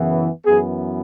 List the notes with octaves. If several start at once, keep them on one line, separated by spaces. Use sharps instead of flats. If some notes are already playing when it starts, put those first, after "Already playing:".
Already playing: F#2 C#3 E3 B3
F#2 E3 B3 G#4